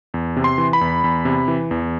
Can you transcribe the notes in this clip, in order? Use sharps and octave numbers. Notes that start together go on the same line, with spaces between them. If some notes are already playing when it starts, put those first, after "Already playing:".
E2
C3
C6
E3
B5
E2
E2
C3
E3
E2